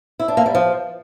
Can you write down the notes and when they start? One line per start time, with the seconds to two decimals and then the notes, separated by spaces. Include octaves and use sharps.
0.20 E4
0.28 D4
0.37 A#3
0.46 G3
0.55 F3